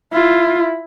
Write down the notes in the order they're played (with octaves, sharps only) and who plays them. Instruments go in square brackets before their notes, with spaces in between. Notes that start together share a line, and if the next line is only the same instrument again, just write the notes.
[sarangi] E4 [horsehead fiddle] F4